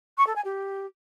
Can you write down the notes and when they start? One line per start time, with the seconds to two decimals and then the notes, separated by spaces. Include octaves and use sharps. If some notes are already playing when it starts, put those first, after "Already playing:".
0.18 C#6
0.27 A4
0.36 G#5
0.45 G4